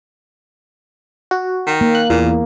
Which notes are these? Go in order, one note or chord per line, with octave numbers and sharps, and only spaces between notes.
F#4
D#3
A#3
F#6
E2 A#2